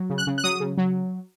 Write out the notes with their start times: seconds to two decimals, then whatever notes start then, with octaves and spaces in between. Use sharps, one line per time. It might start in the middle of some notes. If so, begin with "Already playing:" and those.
Already playing: F#3
0.10 C#3
0.18 F#6
0.27 C#3
0.38 F#6
0.44 F#3 D#6
0.60 C#3
0.78 F#3